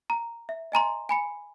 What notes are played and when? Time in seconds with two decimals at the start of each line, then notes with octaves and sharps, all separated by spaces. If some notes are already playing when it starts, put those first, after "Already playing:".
0.10 A#5
0.49 E5
0.72 D#5 G#5 A#5 C6
1.09 G#5 B5 C#7